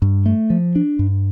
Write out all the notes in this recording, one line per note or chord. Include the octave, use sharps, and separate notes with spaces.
G2
A3
F3
D4
G2